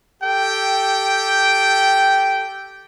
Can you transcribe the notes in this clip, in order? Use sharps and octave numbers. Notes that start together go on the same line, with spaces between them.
G4 A4 G5